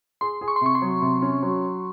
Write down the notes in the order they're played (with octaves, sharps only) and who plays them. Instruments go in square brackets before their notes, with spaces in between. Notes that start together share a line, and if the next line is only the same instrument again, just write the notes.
[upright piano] G#4 [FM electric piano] C6
[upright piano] G#4
[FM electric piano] C#6
C6
[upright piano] C3 [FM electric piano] C#6
[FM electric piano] C6
[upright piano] F#3
C3
C#4
F#3